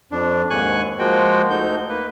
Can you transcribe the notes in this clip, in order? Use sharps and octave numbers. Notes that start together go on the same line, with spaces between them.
F2 D4
D#2 G#2 G#5 C#6 F#6
F3 G#3 A#3 F#4 G5
D2 D3 D#4 G6
A#3 B4